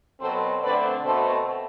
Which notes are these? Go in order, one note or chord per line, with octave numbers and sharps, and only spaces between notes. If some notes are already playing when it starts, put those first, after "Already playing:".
B2 F#3 C4 A4 C5
D3 A3 C4 B4 D5
B2 A3 C4 A4 C5